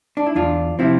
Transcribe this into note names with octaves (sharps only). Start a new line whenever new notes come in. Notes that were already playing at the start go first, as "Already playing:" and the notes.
D4
E4
E2 D4 F4
C3 F3 C4 E4